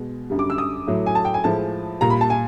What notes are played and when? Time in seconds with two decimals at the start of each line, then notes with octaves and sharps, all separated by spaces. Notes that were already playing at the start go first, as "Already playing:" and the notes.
Already playing: B2 G#3
0.30 F#2 D3 G3
0.39 D6
0.50 E6
0.58 D#6
0.87 A2 F#3 A3
1.06 G#5
1.15 A5
1.25 G5
1.34 G#5
1.44 A2 F3 G#3 A5
2.01 A#2 G3 A#5
2.10 B5
2.21 A5
2.30 G#5